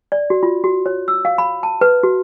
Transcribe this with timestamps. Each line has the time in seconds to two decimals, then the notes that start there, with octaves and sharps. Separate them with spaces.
0.12 D5
0.30 F#4
0.43 F4
0.64 F#4
0.86 C#5
1.08 E6
1.25 F5
1.38 B5
1.63 A5
1.81 B4
2.03 F#4